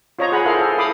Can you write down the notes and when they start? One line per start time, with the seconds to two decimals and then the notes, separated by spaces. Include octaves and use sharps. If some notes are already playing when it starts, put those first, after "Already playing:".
0.19 F4 C5 C#5 D#5 A#5
0.32 G#4 F#5 A#5 B5
0.45 E4 A4 A#4 C5 F5
0.60 G#4 A4
0.77 E4 A4 F5 B5 D6 D#6